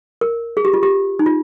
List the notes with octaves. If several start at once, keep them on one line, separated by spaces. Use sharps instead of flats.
A#4
G#4
G4
F4
G4
D#4
F4